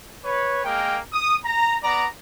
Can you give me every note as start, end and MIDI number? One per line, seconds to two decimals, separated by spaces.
0.24 0.60 71
0.24 0.60 73
0.64 0.98 56
0.64 0.98 58
0.64 0.98 70
0.64 0.98 79
1.12 1.34 87
1.44 1.76 82
1.83 2.05 59
1.83 2.05 74
1.83 2.05 82